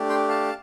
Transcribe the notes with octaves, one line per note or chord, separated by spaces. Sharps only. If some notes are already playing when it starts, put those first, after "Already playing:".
Already playing: A3 D4 G4
G5 C6
F5 A5